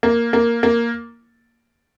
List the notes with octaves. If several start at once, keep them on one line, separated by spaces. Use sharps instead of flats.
A#3
A#3
A#3